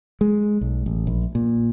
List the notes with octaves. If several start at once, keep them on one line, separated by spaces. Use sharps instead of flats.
G#3
B1
A1
A#1
A#2